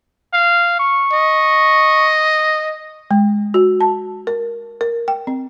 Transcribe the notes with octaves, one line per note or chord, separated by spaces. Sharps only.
F5
C#6
D#5
G#3
F#4
A5
A#4
A#4
G5
C4